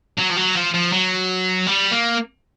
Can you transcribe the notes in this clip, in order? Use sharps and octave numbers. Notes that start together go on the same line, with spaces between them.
F#3
F3
F#3
F3
F3
F#3
G3
A#3